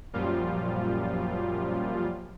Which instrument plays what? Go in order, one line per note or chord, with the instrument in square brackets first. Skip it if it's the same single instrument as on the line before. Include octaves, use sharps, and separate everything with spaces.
[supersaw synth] F#2 A#2 F3 G3 F4